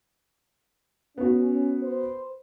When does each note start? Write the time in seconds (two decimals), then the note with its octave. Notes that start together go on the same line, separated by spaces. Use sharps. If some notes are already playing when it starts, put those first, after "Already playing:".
1.18 B3 C#4 F#4
1.83 B4 C5